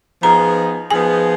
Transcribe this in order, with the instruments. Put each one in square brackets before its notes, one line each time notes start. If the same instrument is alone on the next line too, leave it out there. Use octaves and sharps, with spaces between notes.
[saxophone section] F3 B3 D#4 G#4 [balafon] A#5
[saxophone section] F3 B3 D#4 G#4 [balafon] G#5